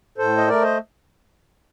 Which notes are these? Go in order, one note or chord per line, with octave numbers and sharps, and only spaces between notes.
A2 A4 C5
D#5
A3 A#4 D5
C5 D#5